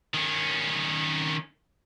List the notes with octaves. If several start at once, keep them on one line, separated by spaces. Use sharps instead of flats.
D#3 C#4